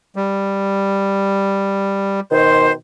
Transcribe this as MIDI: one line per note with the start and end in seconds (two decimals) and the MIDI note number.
0.16 2.20 55
2.31 2.71 47
2.31 2.71 51
2.31 2.71 72